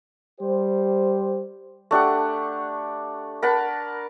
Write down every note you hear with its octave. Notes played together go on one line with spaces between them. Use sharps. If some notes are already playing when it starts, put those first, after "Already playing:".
G3 G4 C5
A3 D4 G4 F#5
A#4 F#5 A5 B5